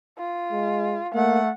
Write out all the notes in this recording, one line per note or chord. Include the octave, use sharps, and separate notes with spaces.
F4
G#3
A3 A#3 F#5